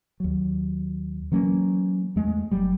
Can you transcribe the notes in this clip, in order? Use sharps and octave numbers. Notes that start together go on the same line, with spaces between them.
D#2 F#3
E3 F#3 A#3 C#4
E2 G#3 A3
G1 F#3 G3